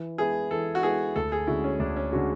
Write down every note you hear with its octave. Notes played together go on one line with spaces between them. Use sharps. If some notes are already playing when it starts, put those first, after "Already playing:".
Already playing: E3
G#3 B3 E4 G#4
E3 A4
F#4
G#3 B3 E4 G#4
D2 A4
G#4
D3 G#3 C#4 E4 F#4
C#4
D2 D4
C#4
D3 G#3 C#4 F#4